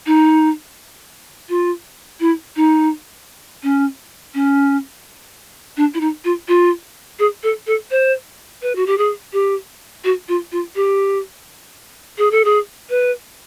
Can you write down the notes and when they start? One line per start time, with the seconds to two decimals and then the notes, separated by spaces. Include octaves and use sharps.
0.06 D#4
1.49 F4
2.20 E4
2.56 D#4
3.63 C#4
4.34 C#4
5.77 D4
5.94 E4
6.00 D#4
6.24 F4
6.48 F4
7.19 G#4
7.43 A4
7.67 A4
7.91 C5
8.62 B4
8.76 F#4
8.86 G4
8.98 G#4
9.33 G4
10.04 F#4
10.28 F4
10.52 F4
10.75 G4
12.18 G#4
12.31 A4
12.45 G#4
12.90 B4